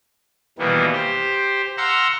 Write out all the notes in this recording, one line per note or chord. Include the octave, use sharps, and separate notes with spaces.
B2 D#3 E3 G3 A#3 B3
G4 C5
F5 F#5 A#5 C6 E6